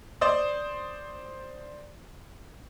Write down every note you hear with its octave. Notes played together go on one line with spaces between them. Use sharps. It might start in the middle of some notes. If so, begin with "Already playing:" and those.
C5 D5 C6 D#6